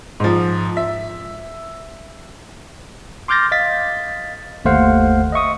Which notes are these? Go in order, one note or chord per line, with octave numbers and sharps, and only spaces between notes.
G#2 F3
E5
C6 D6 F6 G6 A6 A#6
D#5 F5 A6 B6
G1 D#2 A3 C5 F5 F#5
D#5 E5 C#6 D#6